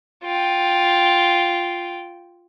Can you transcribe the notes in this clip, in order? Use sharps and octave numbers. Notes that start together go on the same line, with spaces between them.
F4 G5